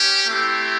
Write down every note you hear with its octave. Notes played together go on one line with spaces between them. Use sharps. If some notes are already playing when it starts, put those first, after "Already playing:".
Already playing: C#4 G4
A3 C4 E4 G4